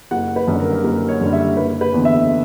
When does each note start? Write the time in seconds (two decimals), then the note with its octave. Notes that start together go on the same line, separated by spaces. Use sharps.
0.11 F#1 F#5
0.36 B4
0.48 F#2 D3 G3
0.60 A#4
0.84 F#1 A#4
1.09 C#5
1.21 F#2 D3 G3
1.33 E5
1.57 F#1 B4
1.81 B4
1.93 E2 D3
2.05 E5